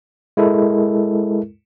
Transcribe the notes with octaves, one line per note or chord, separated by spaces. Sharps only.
G#3 E4 A4 A#4